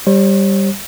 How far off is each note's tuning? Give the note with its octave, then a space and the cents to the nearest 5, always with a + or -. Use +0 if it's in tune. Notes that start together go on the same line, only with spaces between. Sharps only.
G3 +0 C#5 -45